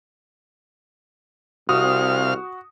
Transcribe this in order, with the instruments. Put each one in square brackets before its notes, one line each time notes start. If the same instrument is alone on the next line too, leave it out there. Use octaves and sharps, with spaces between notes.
[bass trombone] C2 [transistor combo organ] C3 F5 F6 [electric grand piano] F#4 [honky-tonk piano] D#6